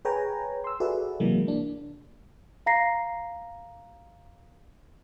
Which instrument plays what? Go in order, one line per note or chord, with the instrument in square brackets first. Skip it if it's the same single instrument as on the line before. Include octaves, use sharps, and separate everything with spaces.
[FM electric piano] G#4 B4 C#5 G5 G#5 A#5
C6 E6
F#4 G#4 A4 B4 D5 E5
C3 E3 F#3 G#3 A#3
A#3 D4
[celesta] F5 A#5 A#6 C7